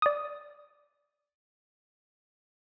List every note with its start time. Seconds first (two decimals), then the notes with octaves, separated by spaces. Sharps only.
0.02 D5 D#6